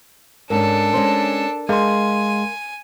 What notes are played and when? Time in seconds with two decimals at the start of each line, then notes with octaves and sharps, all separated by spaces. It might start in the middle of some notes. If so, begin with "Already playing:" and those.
0.50 G#2 G#3 C#4 D4 A4 A#4
0.94 G#3 C#4 C5
1.69 G#3 A#4 F5 G#5 C6